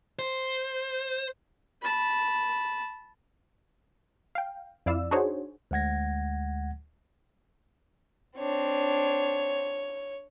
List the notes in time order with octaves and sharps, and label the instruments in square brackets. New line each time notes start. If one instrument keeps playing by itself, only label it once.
[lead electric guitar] C5
[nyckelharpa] A5 B5
[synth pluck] F5 G5
F2 E4 D5 F5 E6
D4 D#4 F#4 G#4 C5 C#5
[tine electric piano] D2 G#3 F#5 G#6 A#6
[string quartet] C4 D4 [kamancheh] C#5